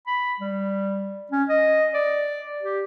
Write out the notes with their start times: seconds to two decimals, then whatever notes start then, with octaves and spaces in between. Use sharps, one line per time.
0.07 B5
0.40 G3
1.32 C#4
1.49 D#5
1.94 D5
2.63 G4